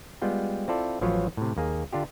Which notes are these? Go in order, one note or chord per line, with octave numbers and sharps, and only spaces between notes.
G3 G#3 B3 F4 G5
C4 E4 F4 A4 D5
A1 F3 F#3 F4 B4 C#5
A2 C3
D#2 A#3 G#4
D3 D4 F4 G4